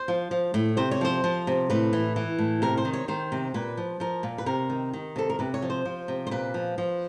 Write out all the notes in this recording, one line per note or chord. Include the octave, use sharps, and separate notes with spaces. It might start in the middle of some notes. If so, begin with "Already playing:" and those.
Already playing: C5
F3
F3
A2
C3 C5
C#5
F3 C5
F3
C3
A2 B4
E3
E3
A2
C3 A#4
C5
D#3
C#5
D#3 C5
C3
A#2 B4
F3
F3 A#4
A#2
B4
C3 A#4
D#3
D#3
C3 A4
A#4
C3 B4
C#5
F3
C5
F3
C3
C5
A#2 B4
F3
F3